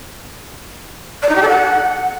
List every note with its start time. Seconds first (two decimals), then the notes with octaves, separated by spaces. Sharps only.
1.23 D5
1.29 D#4
1.36 G4
1.42 A4
1.48 F#5